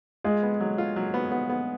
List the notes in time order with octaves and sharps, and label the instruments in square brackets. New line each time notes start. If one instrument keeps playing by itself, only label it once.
[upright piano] G#3 G#4 [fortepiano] F4
[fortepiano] B3
F#3
F4
F#3
B3
B3
B3